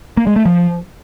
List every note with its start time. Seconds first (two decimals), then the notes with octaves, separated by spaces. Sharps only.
0.17 A#3
0.27 G#3
0.36 A3
0.46 F3